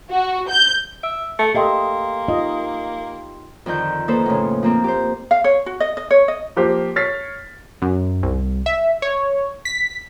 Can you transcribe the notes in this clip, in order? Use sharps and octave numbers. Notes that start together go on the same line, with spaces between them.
F#4
G6
E5 E6 D7
A3 C#7
A#3 G4 A4 D#5 E5 G5 C6
D#4 F4 D#5
F2 D3 D#3 G6
A#3 D#4 A4 B4 C5
A2 C#3
F3 A#3 C4
G4 C5
F5
C#5
F#4
D#5
D#5
C#5
D#5
F3 A#3 G4 C5
C#5 F6 A6 B6 C7
F#2
C2
E5
C#5
B6